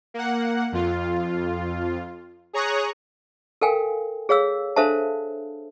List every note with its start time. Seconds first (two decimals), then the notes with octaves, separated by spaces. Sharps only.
0.14 A#3 F#5
0.72 F2 F4
2.53 G#4 C#5 A#5 C#6 D#6 F#6
3.62 A4 A#4 F5 G5 G#5
4.29 G#4 C#5 F5 E6
4.76 D4 A4 C5 E5 F5 A5